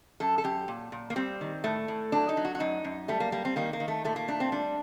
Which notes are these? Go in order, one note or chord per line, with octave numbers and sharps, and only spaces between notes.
F#2 A4
A4
F#2 G4
A#2
A#2
A#3
G3 C4
D#3
A2 A3
A2
F#3 D4
D#4
F#3
F#4
F#4
F#2 D#4
F#2
G3 A3
A#3
G3 A#3
C4
D#3 A#3
A#3
D#3
A3
A#2 A3
A#3
A3 D4
C4
G3 D4